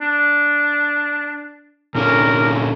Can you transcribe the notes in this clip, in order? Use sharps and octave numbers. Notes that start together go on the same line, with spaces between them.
D4
A#2 D3 C#4 A#4